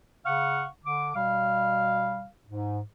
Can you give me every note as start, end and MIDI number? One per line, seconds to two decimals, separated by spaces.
0.25 0.65 49
0.25 0.65 77
0.25 0.65 78
0.25 0.65 85
0.84 1.13 50
0.84 1.13 86
1.15 2.25 47
1.15 2.25 55
1.15 2.25 77
2.47 2.80 44